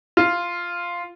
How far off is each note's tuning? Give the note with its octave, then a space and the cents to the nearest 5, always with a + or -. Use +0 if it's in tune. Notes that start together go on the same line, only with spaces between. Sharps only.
F4 -5